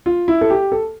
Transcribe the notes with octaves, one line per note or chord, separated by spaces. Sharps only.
F4
E4
A4
G4
A4